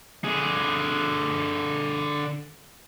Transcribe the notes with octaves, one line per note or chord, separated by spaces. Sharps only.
D3 G#4